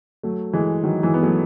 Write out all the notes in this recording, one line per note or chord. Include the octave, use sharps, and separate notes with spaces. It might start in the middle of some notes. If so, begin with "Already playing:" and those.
F#3 A3
E3 G#3
D#3 F#3
E3 G#3
B3
F#3 A3